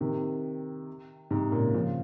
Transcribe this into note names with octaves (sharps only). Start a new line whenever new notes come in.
C3 D#3
G#2 C3
A#2 C#3
C#3 F3